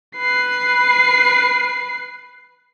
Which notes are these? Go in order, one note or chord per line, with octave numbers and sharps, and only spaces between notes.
B4 C7